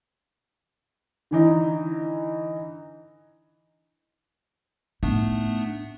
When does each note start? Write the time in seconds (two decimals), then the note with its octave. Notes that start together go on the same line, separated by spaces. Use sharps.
1.31 D3 E3 D#4
5.03 A2 A3 B3 D4 D#4